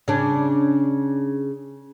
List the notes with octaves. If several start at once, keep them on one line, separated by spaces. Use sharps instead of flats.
C#3 D4